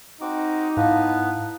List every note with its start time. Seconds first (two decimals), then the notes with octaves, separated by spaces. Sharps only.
0.21 C4 D#4 F#4 D6
0.77 G#2 B3 E4 B4 F5 A5